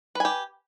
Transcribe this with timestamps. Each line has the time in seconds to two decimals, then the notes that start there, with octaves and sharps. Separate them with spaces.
0.15 B4
0.20 G#5
0.25 G4